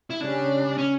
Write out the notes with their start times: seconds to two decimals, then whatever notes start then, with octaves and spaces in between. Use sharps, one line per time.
0.10 E4
0.20 C#3 G3 C#4 D4
0.78 C#4